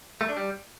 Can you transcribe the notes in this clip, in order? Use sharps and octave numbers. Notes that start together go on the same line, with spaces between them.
A3
D4
G3